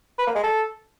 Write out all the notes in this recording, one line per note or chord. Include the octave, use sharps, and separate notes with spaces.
B4
A#3
G#3
A4